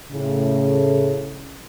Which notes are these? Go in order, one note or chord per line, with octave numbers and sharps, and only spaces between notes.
A2 C#3